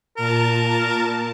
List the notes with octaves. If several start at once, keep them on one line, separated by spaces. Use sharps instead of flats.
A#2 A#4 A5